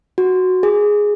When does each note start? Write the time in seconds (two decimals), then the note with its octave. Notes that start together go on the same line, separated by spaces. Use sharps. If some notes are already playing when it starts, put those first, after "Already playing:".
0.18 F#4
0.63 G#4